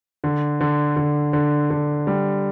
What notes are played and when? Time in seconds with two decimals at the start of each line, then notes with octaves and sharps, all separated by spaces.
0.24 D3
0.60 D3
0.96 D3
1.33 D3
1.70 D3
2.07 G3